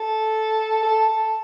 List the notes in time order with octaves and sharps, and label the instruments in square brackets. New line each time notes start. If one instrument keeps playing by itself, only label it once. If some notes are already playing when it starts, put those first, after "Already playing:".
Already playing: [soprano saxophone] A4
A4
A4